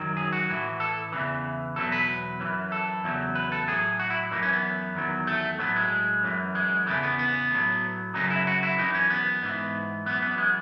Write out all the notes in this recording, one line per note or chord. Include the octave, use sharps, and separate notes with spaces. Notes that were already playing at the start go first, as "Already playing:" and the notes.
Already playing: F#2 D#3 F#3
G#4
F#4
A2 E3
A4
E2 C#3 E3
E2 B2 F#3 A4
B4
F#2 E3
A4
E2 C#3 F#3
B4
A4
A2 F#3 G#4
F#4
E4
F#2 E3 D#4
C#4
B3
E2 D#3 F#3
A3
A2 F#3 B3
G#3
F#2 E3
G#3
E2 C#3 E3 A3
B3
B3
A2 F#3
F#2 C#3 F#3 D#4
E4
F#4
E4
F#2 E3 D#4
C#4
B3
G#2 E3
F#2 E3 B3
B3
G#3